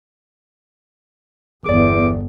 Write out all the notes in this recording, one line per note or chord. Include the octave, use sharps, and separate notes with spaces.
G1 E2 G#4 D5 D6